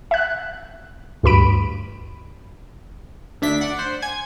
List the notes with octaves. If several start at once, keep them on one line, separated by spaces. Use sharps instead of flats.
E5 F#6
D2 G2 B5 D7
D2 D4 E5 B6
D5 F#5
C5
G#5 G#6